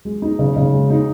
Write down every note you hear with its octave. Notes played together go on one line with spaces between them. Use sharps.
G#3
D#4
C#3
C#3
G#3
D#4